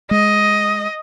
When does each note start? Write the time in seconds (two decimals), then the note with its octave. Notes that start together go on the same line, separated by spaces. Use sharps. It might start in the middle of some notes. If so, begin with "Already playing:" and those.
0.11 G#3 D#5